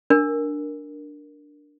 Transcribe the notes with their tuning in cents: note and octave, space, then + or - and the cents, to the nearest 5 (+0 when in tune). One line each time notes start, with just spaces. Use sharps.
D4 +0 A#4 +0